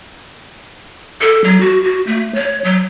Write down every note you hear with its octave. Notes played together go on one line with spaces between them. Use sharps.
A4
F#3
F#4
F#4
A3
C#5
F#3